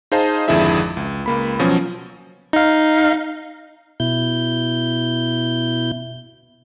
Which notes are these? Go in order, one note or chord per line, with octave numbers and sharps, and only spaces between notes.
D#4 G#4 C5 D#5 F5 A5
G#1 F2 D3 E4 G#4 E5
C#2
C#2 A#3 B5
B2 F3 F#3 C#4
D#4 F5
B2 E4 G6